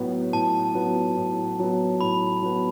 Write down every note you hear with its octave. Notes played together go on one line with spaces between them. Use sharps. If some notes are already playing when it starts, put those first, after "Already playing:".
Already playing: A2 F#3 B3
A2 A5
F#3 B3
A2
F#3 B3
A2 B5
F#3 B3